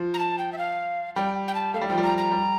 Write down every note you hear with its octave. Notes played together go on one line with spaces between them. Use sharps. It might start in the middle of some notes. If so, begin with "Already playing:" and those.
Already playing: F3
A#5
A5
G5
E5
F5
G3 G5
G5
A5
A3 F5
G3
F3 G5
G3
A#5
A#5
G3